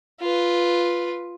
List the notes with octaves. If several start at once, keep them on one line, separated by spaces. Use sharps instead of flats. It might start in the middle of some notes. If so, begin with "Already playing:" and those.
F4 B4